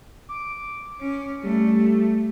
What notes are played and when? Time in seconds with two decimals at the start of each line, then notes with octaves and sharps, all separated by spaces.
0.29 D6
1.00 C#4
1.43 G3 A3